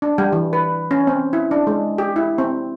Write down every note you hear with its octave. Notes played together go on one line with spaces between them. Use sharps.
D4
G3
E3
B4
C#4
C4
E4
D4
G#3
G4
E4
C4